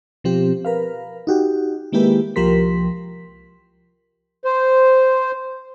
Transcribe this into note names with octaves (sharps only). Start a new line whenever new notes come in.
B2 F3 C4 G4
A#4 B4 F5
D#4 F#4 G4
D#3 G#3 A#3 E4 G4 B4
C2 F3 G4 A#4 C6 B6
C5